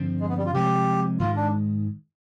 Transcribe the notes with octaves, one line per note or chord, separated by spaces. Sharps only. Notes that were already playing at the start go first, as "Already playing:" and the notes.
Already playing: G2 D3 F3 C4
G#3
B3
G3
F4
C3 F3 G#3 G4
G#2 D#3 G#3 F4
D4